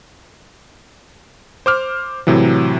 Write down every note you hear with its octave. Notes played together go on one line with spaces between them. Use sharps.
C5 D6 F6
A2 C3 E3 F#3